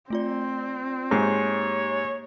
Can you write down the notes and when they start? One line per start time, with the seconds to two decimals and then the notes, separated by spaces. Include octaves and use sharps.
0.10 A3 C4 F4 D5
1.11 G#2 A#3 G4 C#5 C7